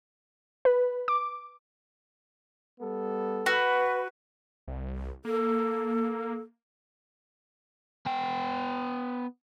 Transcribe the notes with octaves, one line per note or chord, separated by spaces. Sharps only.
B4
D6
G3 B3 A4
F#4 B4
C2
A#3 A4
B3 G5